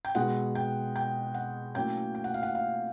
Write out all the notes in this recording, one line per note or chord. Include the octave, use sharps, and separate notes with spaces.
G5
B2 G#3 B3 D#4 F#5
G5
G5
F#5
A2 F#3 A#3 C#4 G5
G5
F#5
F5
F#5
F5